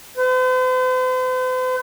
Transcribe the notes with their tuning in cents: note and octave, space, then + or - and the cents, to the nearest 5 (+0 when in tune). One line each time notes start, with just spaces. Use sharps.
C5 -45